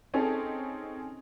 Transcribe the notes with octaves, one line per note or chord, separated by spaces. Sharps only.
C4 C#4 D#4 G#4 A4